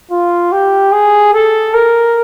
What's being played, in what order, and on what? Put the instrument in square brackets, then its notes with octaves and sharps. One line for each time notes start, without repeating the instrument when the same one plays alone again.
[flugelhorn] F4
G4
G#4
A4
A#4